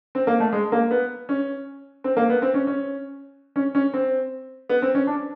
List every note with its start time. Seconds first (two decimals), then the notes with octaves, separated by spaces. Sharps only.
0.15 C4
0.27 A#3
0.40 A3
0.53 G#3
0.72 A#3
0.91 B3
1.29 C#4
2.04 C4
2.17 A#3
2.30 B3
2.42 C4
2.54 C#4
2.67 C#4
3.56 C#4
3.75 C#4
3.93 C4
4.69 B3
4.82 C4
4.95 C#4
5.07 D4